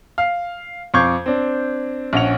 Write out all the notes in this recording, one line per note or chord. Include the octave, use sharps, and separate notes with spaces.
F5
F2 F5 C#6 D6 G6 G#6
C4 D4
A#1 C#4 F#5 F7